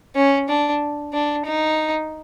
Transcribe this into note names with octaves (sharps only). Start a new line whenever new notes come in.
C#4
D4
D4
D#4